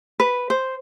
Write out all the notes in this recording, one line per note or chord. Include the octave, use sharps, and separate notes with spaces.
B4
C5